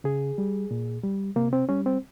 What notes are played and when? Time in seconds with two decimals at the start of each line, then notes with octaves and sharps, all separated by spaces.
0.04 C#3 G#4
0.38 G3
0.71 A#2
1.03 G3
1.36 C3 A#3
1.53 C4
1.69 G3 C#4
1.86 C4